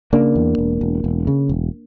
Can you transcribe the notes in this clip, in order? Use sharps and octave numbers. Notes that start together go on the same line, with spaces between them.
C#3 A#3 D4
E2
E1
E1
E1
C#3
E1